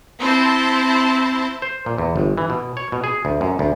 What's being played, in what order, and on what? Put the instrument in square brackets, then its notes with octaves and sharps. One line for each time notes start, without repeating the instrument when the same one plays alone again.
[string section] C4 E4 C5 A5
[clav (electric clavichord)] C5
A#2
E2
G1
E3
B2
C#5
B2
G#4
D2
F#2
D2